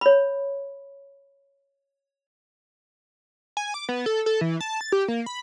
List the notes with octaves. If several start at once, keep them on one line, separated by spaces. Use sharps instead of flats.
C#5 B5
G#5
D6
B3
A4
A4
E3
A5
A6
G4
A#3
B5